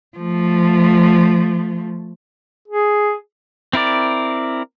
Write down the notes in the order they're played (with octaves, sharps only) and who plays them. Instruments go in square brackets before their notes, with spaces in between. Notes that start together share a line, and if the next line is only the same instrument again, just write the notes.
[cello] F3 A3
[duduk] G#4
[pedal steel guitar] C4 E4 A#4 D5